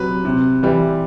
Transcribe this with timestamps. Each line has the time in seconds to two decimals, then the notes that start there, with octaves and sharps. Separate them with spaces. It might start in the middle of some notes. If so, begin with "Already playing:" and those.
Already playing: C3 F#3 B4
0.25 C3
0.63 E3 G3